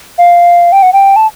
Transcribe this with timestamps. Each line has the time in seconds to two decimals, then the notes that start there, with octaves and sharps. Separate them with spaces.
0.18 F5
0.72 G5
0.83 F#5
0.93 G5
1.16 A5